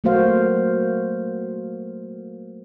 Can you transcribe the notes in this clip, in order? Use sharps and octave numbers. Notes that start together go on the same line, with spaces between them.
F#3 A3 A#3 F#4 C5 F5